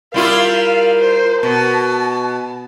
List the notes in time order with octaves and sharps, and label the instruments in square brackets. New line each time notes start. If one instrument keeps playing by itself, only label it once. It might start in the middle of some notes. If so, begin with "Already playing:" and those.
[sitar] G3 E4 F4 [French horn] A#4 [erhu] F5
[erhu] F5
C5
[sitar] B2 [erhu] A5